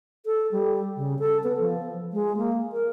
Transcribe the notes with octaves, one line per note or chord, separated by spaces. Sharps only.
A4
G3
C#3
A4
B3
F3
G#3
A#3
A#4